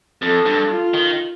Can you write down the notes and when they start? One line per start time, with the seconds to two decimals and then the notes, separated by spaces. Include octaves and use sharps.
0.22 F2 A4
0.45 G2
0.70 F4
0.94 D#3